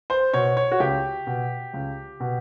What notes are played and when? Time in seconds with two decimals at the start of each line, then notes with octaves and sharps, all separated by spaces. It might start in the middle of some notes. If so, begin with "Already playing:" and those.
0.10 C5
0.33 B2 C#5
0.57 C#5
0.72 F#4
0.80 C#2 G4
1.27 B2
1.73 C#2
2.20 B2